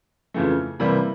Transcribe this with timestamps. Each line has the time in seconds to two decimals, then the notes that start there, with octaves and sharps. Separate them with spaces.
0.34 F2 C#3 E3 A3
0.80 C3 E3 G3 A#3 B5